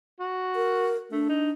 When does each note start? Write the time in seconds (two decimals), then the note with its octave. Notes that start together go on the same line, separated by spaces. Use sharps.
0.20 F#4
0.56 A#4
1.12 A3 D4
1.29 D#4